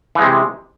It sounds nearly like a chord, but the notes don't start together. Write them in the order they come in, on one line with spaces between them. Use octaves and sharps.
E3 G#3 C3